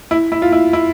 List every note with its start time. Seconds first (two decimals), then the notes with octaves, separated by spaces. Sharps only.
0.11 E4
0.32 E4
0.42 F4
0.52 E4
0.73 E4